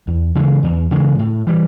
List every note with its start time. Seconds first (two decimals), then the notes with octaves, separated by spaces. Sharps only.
0.07 E2
0.35 C#3 E3 G#3
0.63 E2
0.91 C#3 E3 G#3
1.19 A2
1.47 E3 G3